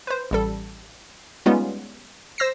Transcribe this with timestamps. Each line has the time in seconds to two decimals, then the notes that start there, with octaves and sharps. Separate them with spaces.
0.07 B4 C5
0.31 A1 G3 A4
1.46 G3 G#3 B3 C#4 D#4 F4
2.38 C5 E6 A#6 C7